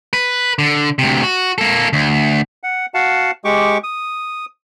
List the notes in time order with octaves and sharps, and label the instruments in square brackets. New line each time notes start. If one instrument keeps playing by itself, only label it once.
[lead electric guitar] B4
D3
D2 C3
F#4
A#3 A4
D2
[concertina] F#5
F#4 F5 F#5 A5
G#3 G4 C#6 D6
D#6